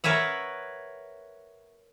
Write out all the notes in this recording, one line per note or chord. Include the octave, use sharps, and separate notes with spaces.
A#4 B4 C#5 E5 F#5